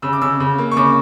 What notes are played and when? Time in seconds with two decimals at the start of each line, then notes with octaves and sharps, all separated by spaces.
0.02 C#3 E6
0.13 D6
0.22 C#3 E6
0.40 C#3
0.58 A#3
0.71 C#6
0.76 C#3 D6